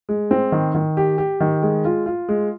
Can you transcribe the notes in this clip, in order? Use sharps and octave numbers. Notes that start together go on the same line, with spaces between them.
G#3
C4
D#3
D#3
G4
G4
D#3
G#3
F4
F4
G#3